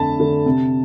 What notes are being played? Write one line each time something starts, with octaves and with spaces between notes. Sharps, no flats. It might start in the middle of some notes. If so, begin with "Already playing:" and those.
Already playing: F2 D3 A3 A5 B5
D3 A3
C3